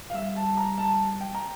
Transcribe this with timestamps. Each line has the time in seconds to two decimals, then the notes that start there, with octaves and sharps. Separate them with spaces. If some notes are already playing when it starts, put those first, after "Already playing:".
0.10 F5
0.15 G3 E5
0.36 A5
0.57 A#5
0.78 A5
1.21 G5
1.35 A#5